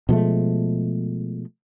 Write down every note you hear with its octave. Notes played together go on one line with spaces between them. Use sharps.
B2 F3 G#3 A3